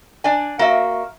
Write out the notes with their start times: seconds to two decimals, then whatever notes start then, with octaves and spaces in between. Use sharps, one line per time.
0.24 D4 D5 G#5
0.59 A#3 F#4 E5